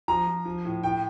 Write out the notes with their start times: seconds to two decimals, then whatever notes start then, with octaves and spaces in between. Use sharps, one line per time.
0.08 F3 A#5
0.27 F3
0.45 F3
0.65 A2
0.83 A2 G5